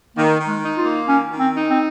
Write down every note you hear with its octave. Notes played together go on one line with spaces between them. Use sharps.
D#3 A#3
D#3
G#3
D#4
F4
A#3
D#3 C#4
D#3
C4
D#4
C4